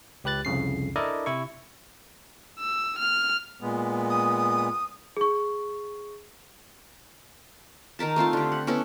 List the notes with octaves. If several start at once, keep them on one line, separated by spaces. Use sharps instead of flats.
C#2 G4 B4 F#6 A6
C2 F2 C#3 C7
D4 E4 A4 A#4 D5 D#5
C3 E4 C#6
E6
F6
A#2 G#3 B3
D#6
G#4 C#6
D#3 D#4 A#4 A5
A3 C4 F4 A5
D3 G4
F#5
B3 C#4 E4 A4